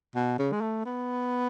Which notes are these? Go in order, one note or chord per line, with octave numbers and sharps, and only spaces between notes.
B2
C#3
G#3
A3
B3